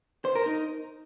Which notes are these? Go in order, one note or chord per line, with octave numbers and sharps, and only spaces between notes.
C5
A#4
D#4